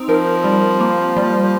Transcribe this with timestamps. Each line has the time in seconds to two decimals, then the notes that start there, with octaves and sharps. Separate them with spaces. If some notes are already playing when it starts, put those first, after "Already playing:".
Already playing: C4 D#4
0.09 F3 A#4
0.44 G3
0.80 A#3
1.17 G3